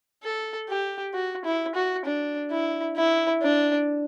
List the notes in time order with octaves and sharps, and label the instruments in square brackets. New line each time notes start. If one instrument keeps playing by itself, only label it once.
[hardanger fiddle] A4
G4
F#4
E4
F#4
D4
E4
E4
D4